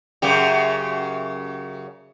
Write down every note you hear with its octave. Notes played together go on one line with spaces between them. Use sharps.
F#2 C#3 G4